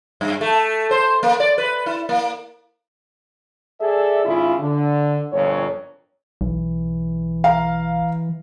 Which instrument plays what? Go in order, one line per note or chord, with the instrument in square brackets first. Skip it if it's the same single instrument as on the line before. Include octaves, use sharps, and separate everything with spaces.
[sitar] G2
A3
C5
A#3
D5
B4
E4
A#3
[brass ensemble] G#4 A4 D5 E5
G#1 C#3 E4 F4
D3
G1 F2 A#2 C#5
[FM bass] B1 [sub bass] E3
[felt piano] F5 A#5